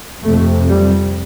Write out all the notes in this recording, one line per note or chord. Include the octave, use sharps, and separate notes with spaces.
F2 C3 A3
G3